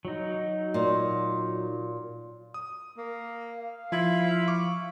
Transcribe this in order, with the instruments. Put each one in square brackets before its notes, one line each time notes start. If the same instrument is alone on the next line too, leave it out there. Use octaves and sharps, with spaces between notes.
[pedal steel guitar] F#3 D#4
[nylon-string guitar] A#2
[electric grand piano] D#6
[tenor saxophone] A#3
[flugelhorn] F5
[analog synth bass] F3 [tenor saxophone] E4 [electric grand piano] F4 G#6
[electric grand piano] C#6 D6